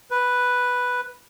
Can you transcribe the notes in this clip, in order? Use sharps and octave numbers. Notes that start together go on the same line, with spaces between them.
B4